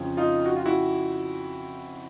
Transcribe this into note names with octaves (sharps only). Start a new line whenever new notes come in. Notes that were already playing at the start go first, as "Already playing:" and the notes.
Already playing: F2 C#3 F3
D#4 F4
F#4
F4
E4 F#4